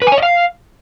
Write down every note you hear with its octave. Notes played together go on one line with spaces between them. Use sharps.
B4
G#5
C#5
D#5
F5